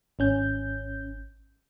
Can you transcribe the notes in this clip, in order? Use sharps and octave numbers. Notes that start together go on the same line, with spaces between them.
G#1 C#4 G6